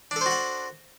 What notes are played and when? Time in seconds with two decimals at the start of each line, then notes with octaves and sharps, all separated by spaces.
0.11 D4
0.16 A4
0.21 C5
0.26 F#4
0.31 F#5